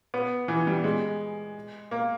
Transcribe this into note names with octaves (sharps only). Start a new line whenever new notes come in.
B3
E3
G3
G#3
A#3